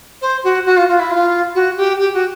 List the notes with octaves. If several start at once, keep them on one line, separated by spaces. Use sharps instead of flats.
C5
F#4
F#4
F4
F4
E4
F4
F#4
G4
G4
F#4